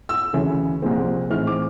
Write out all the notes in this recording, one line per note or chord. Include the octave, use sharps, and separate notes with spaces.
E6
D2 C#3 E3 A3 C#4
C2 A#2 F3 G#3 C4
A2 E3 G#3 C4 D#4 F6
D6